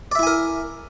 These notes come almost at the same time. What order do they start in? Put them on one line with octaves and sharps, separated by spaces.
D5 E5 E4 G#5 A#4